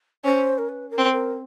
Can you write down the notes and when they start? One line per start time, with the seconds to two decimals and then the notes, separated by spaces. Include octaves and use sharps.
0.24 C#4 C5
0.58 A#4
0.69 B4
0.91 A#4
0.98 C4
1.12 A#4